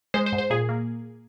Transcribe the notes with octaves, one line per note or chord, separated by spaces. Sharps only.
G#3 C5
C5
G#2
C5
A#2 G#4
A#3